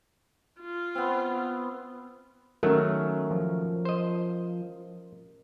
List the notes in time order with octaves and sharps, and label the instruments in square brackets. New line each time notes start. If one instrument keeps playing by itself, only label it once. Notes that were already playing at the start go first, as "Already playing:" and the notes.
[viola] F4
[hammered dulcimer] B3 C4
[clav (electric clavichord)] D#3 F#3 A3 [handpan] C#4 A#4
[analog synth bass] F3
[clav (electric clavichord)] C5 D#5